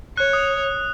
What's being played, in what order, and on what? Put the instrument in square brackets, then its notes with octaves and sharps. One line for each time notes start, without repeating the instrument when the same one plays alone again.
[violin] C#5 [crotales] F#6
[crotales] D#6